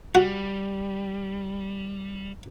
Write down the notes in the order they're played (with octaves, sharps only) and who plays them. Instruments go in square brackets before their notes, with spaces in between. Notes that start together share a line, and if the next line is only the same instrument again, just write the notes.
[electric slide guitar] G3 [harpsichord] F#4